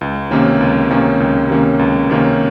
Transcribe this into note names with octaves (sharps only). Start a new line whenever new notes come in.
C#2
C3 D#3 A#3 C#4
C#2
C3 D#3 A#3 C#4
C#2
C3 D#3 A#3 C#4
C#2
C3 D#3 A#3 C#4